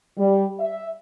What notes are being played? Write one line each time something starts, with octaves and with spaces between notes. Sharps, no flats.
G3
E5